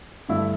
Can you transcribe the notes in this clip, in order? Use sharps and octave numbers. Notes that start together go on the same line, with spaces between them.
G2 D3 A3 E4